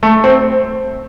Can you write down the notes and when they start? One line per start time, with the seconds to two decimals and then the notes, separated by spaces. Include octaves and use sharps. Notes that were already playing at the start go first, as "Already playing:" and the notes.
0.03 A3
0.24 C4